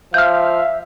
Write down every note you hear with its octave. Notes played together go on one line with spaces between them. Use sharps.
F3 E5 F5 F6 G6